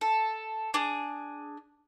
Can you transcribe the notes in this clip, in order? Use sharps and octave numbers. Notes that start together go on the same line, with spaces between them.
A4
D4 G#4